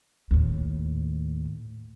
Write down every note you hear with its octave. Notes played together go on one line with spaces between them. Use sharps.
D#2 A2